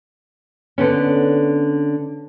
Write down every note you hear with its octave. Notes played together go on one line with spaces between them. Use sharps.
D3 B3 C#4